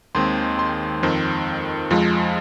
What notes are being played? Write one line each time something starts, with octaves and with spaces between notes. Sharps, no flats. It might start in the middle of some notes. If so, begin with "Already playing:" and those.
D#2 D#3 G#3 C4 C6
C6
F2 D#3 C4
F2 F3 G#3